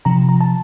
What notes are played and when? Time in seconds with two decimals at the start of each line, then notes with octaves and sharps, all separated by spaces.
0.05 C3 F3 A#5
0.29 A#5
0.41 A5